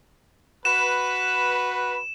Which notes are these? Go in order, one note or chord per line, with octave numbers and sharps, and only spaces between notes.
F#4 B4 E7